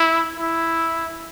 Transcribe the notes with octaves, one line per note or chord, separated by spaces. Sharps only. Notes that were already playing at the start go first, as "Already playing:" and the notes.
Already playing: E4
E4